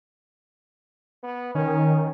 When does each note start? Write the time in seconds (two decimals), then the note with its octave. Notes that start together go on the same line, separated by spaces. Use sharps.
1.23 B3
1.55 D#3 C#4